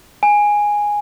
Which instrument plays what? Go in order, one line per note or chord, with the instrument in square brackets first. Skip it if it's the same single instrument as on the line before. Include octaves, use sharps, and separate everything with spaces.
[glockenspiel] G#5